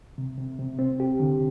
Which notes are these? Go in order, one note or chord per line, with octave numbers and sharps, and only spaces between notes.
C3
C3
C3
C4
G4
D3